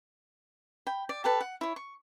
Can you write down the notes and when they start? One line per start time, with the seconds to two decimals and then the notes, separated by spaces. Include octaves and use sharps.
0.87 G5 B5
1.09 D5
1.24 G4 A4 B4 A5
1.41 F#5
1.61 E4 C#5
1.76 C#6